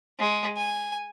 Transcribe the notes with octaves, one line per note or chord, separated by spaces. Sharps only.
G#3
G#5